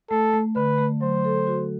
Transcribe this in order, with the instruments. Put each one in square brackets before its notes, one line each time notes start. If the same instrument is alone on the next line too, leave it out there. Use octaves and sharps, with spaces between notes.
[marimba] A3 [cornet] A4
[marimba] A3
[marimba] D3 [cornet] B4
[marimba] A3
[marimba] F#3 [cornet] C5
[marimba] A4
F#4